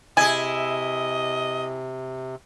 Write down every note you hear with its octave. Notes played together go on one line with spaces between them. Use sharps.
C3 E4 G#4 D#5 G#5